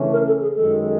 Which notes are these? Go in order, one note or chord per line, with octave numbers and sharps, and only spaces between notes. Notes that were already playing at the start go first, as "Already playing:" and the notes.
Already playing: C#3 E3 A3 C#4
A#4
A4
G#4
F#2 D#3 G#3 A4